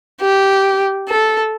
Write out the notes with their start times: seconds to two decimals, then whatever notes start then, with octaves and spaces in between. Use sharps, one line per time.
0.21 G4
1.09 A4